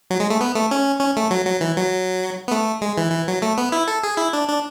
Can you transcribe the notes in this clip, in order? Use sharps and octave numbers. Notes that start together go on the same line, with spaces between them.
F#3
G#3
A3
B3
A3
C#4
C#4
A3
F#3
F#3
E3
F#3
B3
A3
G#3
E3
E3
F#3
A3
B3
E4
A4
G#4
E4
D4
D4